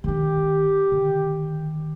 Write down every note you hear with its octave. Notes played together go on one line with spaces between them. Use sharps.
D#3 D4 G4
D3 D#3